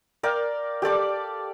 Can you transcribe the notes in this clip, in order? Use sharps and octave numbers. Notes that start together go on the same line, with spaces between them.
A#4 D5 F5 G5
G4 A4 D5 D6